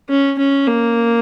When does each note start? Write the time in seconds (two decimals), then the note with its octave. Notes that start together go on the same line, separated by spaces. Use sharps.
0.10 C#4
0.38 C#4
0.67 A#3